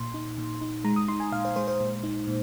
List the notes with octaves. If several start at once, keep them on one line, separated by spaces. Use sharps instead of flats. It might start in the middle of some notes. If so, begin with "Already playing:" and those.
Already playing: A#2 C6
D#4
A#2
D#4
G#3 A#5
D#6
D#4 C6
G#5
A#2 F5
C5
G#3 C5
C5
A#2
D#4
A#2